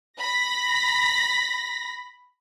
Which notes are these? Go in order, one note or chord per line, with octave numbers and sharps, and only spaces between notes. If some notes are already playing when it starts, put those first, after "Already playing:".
B5 A#6 B6